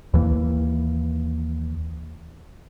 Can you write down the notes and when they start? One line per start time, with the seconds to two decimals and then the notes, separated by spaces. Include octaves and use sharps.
0.14 D#2 E3 A#3